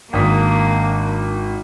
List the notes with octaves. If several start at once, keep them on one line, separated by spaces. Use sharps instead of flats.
G#1 A#3 D4 D#6 B6